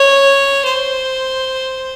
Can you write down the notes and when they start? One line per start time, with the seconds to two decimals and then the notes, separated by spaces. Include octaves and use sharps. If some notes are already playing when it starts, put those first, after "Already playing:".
Already playing: C#5
0.65 C5